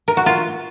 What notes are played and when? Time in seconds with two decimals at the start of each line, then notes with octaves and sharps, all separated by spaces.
0.08 A#4
0.17 F#4
0.26 F4